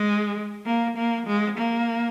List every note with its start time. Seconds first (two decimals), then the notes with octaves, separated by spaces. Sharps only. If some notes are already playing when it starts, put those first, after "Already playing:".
Already playing: G#3
0.66 A#3
0.97 A#3
1.27 G#3
1.58 A#3